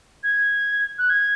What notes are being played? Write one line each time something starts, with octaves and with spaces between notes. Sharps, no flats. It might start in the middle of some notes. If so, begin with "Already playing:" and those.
G#6
F#6
G#6